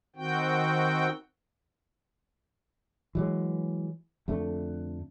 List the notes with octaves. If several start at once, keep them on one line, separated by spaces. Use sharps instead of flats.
D#3 C4 F#4 G5
E3 F#3 G#3
F2 D3 A3